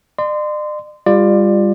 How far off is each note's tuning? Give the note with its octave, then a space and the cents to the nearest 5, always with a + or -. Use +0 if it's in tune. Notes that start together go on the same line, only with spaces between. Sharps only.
D5 +45 C6 -20
G3 +30 F4 +0 D5 +20